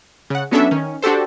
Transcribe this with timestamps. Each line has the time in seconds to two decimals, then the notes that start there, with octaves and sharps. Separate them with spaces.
0.30 C#3 F#5
0.51 F#3 B3 C#4 D4 A4 E5
0.71 D#3 C#4
1.02 D4 F#4 G4 A4 C5